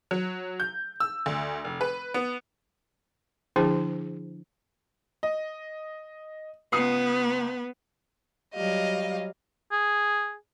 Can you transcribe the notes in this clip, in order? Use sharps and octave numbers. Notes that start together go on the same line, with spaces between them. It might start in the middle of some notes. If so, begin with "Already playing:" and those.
F#3
G6
E6
D2
F1
B4
B3
D3 F3 D4 E4 G#4 C5
D#5
C#2 B3 D#6 C7
F#3 G3 D#5 F5
G#4